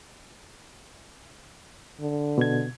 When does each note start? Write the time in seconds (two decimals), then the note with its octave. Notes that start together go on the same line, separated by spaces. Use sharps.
2.00 D3
2.38 B2 G#6